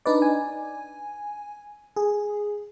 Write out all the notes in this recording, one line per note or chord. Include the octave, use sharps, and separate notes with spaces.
D4 D#4 B4 D5
G#5
G#4